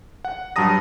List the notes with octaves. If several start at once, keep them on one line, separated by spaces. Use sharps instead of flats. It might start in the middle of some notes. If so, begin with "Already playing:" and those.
F#5
G2 F#3 A5 A#5 D#6 A#6